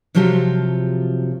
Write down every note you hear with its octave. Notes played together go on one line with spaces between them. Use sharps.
C3 F3 F#3 F4 G4 A4